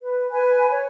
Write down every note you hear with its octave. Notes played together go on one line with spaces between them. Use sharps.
B4
B4 G#5
C#5